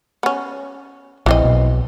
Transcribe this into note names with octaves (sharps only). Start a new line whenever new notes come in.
B3 C#4
A#1 E3 C4 D#5
B1